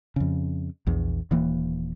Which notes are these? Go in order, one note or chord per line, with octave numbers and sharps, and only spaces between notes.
F2 C#3
A#1 E2
D#1 E3 A#3